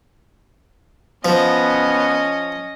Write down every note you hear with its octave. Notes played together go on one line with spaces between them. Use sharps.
F3 B3 C#4 D#5